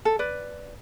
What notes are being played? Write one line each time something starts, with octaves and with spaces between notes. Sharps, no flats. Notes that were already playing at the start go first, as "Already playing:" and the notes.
A4
B4 D5